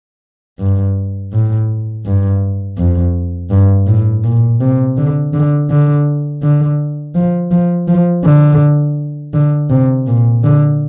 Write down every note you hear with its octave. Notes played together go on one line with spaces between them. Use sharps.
G2
A2
G2
F2
G2
A2
A#2
C3
D3
D3
D3
D3
F3
F3
F3
D3
D3
C3
A#2
D3